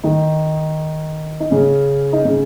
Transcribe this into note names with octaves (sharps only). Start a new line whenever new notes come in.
D#3 D#4
D#4
C#3 C#4
D#4
C#3 C#4